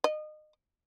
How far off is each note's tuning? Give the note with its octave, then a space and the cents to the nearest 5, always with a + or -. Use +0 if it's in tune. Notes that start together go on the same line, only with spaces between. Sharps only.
D#5 -30